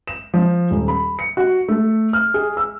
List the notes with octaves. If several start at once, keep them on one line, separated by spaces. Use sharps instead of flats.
E7
F3
D#1
B5
C#7
F#4
A3
F6
G#4
E6